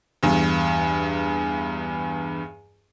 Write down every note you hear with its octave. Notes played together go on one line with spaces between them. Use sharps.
E2 G2